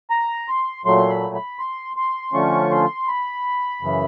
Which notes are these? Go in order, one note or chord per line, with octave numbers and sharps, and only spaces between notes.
A#5
C6
A#2 F#3 A3 C6
B5
B5
C6
C6
D3 F3 A3 C#4 F4 C#6
C6
B5
F#2 C#3 E3